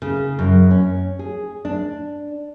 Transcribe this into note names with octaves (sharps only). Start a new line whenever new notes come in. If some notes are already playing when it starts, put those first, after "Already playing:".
C#3
F#2
C#4
G#4
D4